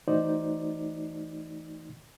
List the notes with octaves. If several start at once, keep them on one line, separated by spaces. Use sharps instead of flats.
E3 A3 D#4 F#4 C5 D5